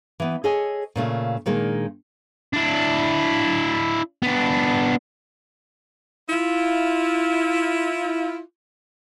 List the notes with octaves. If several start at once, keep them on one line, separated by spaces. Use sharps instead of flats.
E3 B3
G#4 A4 C#5 D#5 G#5
A#2 C#3 A3 F4
A#2 D#3 G#3 A#3 D4
D4 E4
B3 D4
E4 F4